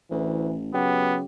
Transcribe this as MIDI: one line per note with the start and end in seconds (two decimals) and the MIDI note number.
0.11 0.71 33
0.11 0.49 38
0.11 0.57 52
0.74 1.24 49
0.74 1.24 54
0.74 1.18 59
0.74 1.23 67